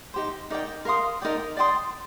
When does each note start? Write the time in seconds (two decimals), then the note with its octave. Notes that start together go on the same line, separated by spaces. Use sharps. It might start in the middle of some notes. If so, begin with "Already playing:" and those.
0.14 D#4 G4 C5
0.50 D#4 A#4 D5 G5
0.85 A#4 F5 C6 D#6
1.22 D#4 A#4 D5 G5
1.57 D5 G5 C6 D#6